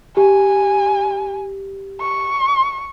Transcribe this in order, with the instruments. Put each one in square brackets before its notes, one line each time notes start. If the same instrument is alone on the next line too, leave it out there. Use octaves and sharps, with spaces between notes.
[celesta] G4 [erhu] G#5
[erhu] C#6